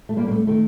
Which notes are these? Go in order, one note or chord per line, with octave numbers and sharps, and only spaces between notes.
A3
G3 A#3
A#3
A3
D#3 A3